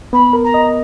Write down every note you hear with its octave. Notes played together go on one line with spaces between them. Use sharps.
B3 B5
A#4
A#5
D#5